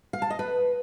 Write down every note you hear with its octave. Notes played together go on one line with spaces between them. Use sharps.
F5
A5
D#5
B4